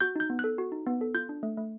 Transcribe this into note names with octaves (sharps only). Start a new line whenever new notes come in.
F#4 G6
D#4 G6
B3
A4 F#6
F#4
D#4
B3
A4
F4 G6
D4
A3
A3